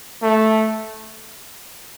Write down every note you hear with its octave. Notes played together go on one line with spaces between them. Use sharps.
A3